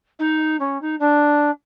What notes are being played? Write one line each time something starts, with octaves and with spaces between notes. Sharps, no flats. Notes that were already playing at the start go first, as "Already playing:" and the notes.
D#4
C#4
D#4
D4